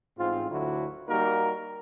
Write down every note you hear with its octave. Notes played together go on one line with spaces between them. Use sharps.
A1 G#2 C4 F4
D2 D3 F#3 E4 F#4
G3 A#3 D#4 F#4 A#4